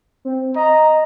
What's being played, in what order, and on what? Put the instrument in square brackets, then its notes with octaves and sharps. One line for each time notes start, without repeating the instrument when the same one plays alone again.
[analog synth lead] C4
[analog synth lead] D#5 [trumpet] A#5